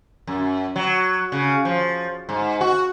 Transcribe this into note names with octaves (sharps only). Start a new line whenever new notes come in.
F#2
F#3
C#3
F3
G#2
F#4